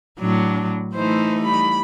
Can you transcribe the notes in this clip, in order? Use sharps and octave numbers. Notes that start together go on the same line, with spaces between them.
A2 F#3 D4
E3 A3 D#4 C5
G3 B5